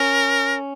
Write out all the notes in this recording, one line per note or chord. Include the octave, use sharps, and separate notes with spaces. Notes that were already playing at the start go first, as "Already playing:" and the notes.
Already playing: C#4 A#4